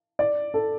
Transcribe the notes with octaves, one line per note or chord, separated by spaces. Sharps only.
D5
A4